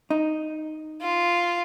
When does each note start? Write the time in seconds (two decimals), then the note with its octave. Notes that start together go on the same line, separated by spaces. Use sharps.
0.10 D#4
1.01 F4